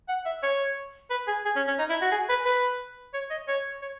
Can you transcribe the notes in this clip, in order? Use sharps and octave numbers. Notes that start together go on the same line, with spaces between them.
F#5
E5
C#5
B4
G#4
G#4
C#4
C#4
D#4
E4
F#4
G#4
B4
B4
C#5
D#5
C#5
C#5